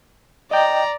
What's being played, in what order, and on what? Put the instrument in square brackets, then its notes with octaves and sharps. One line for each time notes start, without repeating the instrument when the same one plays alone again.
[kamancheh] D5 A#5 [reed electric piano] D#5 G5